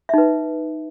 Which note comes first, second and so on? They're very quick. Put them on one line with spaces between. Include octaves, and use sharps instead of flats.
E5 D#4 B4